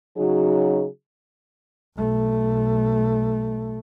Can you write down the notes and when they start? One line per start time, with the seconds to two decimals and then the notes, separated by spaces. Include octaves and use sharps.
0.17 C#3 F#3 D#4 F#4 G#4
1.96 B1 A3